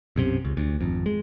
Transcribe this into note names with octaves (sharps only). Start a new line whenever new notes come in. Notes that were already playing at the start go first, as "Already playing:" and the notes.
B1 F#2 C3
C#2
D2
G#1 F2
G#3